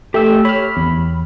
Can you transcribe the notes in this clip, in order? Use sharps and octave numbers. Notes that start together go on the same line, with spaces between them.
A3 G4 G5 E6
C#5 B5 F6
E2